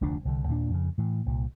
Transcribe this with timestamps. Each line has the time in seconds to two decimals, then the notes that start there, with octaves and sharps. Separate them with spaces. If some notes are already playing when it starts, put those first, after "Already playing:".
0.01 F1 D2 F3 D4
0.25 C2 D3
0.48 D#2 A#2 G#3 D4
0.70 F2 C#3
0.98 A2 E3
1.26 C2 A#2